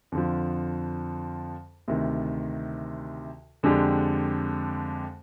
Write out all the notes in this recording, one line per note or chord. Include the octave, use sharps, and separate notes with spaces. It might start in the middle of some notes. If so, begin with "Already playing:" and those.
F2 D3 F3
D2 C3 D#3
F2 D3 G#3 D4 G4